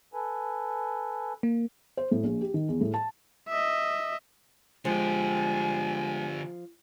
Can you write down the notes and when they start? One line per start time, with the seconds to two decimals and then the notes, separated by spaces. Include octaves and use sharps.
0.14 A4 B4 G#5
1.43 A#3
1.97 C5
2.11 A2
2.23 A#1
2.41 G4
2.54 D#3
2.68 E2
2.81 A2
2.94 A5
3.49 D#5 E5
4.85 D3 F3 G#3 G4 G#5